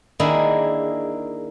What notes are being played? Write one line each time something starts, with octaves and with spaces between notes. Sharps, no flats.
D#3 A#3 D4 E4 G#4